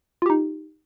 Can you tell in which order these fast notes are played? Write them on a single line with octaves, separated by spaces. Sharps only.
F4 G4 D#4